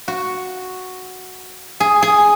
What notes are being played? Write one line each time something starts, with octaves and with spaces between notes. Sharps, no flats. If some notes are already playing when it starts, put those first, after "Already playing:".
F#4
G#4
G#4